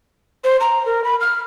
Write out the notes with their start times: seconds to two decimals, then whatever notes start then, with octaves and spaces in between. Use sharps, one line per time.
0.44 C5
0.60 A#5
0.86 A#4
1.04 B5
1.20 F6